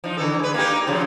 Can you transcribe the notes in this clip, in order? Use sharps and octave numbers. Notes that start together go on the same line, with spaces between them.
F3 D#4
D3 E3 A4
G#3 B4
A#3 D#4 G4
C#3 F3 F#3